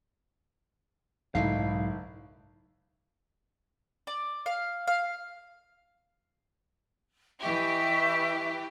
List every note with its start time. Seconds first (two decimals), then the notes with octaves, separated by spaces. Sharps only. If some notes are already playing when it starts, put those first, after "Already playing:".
1.35 F#1 B1 G#2 F#3 A3 D#4 E4 F5
4.07 D5
4.46 F5
4.87 F5
7.41 E3 G4 D#5 E5 C#6